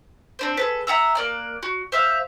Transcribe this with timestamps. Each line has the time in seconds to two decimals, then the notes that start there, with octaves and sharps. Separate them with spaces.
0.39 C4 D4 C5
0.57 G#4 A4 B4
0.87 E5 F#5 A#5 E6
1.15 A#3 D5 F#6
1.63 F#4
1.92 C5 E5 F5